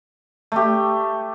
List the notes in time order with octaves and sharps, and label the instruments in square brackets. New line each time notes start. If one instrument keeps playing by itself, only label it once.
[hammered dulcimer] A3 G4